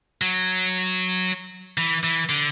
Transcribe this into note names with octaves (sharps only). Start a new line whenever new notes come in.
F#3
E3
E3
D3